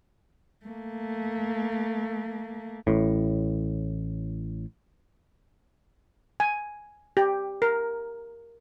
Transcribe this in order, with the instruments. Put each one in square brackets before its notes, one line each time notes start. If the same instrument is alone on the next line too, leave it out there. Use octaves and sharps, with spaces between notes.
[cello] A3 A#3
[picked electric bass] A1 A2
[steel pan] G#5
G4
A#4